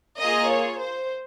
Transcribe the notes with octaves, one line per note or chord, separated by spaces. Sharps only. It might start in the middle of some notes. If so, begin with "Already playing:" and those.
A#3 F4 G#4 D#5
C#5
C5